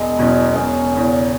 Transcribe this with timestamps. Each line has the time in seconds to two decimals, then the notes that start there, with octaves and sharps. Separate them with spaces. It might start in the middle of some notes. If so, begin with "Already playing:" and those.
Already playing: E1 G#3
0.19 E2 B2 F#3 C#4
0.56 E1 C#4
0.93 E2 C#3